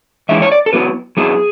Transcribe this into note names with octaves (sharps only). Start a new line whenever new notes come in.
E3 G#3 C#4 E4 E5
C#5
D5
A4
F#3 B3 E4 B4
F#3 B3 E4 G#4